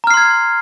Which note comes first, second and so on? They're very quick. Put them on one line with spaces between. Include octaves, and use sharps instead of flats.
A#5 F6 C7 C6 G#6